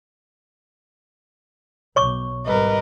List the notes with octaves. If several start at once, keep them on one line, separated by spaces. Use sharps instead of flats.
B1 C#5 C#6 D6
G#1 G3 A#4 B4 D#5